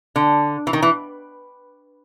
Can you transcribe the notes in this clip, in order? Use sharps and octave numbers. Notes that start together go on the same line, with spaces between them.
D3
E3
D#3
E3